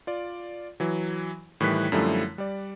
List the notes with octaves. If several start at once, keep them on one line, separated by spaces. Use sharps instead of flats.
F4 D5
E3 F#3
A2 D#3 E3 G3 F#6 B6
F#2 D3 F3 G3 A3 E4
G3 D5